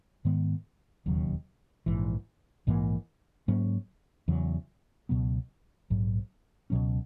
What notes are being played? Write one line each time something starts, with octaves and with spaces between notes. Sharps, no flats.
G#2 D#3 G#3 B3
E1 D#2 C#3 F#3
A#1 G#2 E3
A#1 G#2 E3 A#3
G#2 F#3 A#3 C#4
E2 C#3 F#3
C#2 B2 F#3 B3
A#1 G#2 F#3
C#2 B2 F#3 C#4